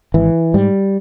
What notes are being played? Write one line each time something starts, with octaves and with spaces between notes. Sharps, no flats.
G#1 E3
G#2 G3